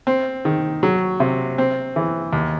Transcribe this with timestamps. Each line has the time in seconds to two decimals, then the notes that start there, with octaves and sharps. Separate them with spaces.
0.07 C4
0.45 D#3
0.83 F#3
1.20 C3
1.58 C4
1.96 E3
2.33 D#2